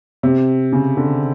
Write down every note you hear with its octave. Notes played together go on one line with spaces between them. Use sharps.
C3
C#3
D3